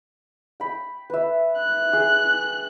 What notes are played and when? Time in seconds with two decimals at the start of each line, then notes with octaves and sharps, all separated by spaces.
0.60 G5 B5
1.10 B4 E5
1.59 F#6
1.93 G#4 G5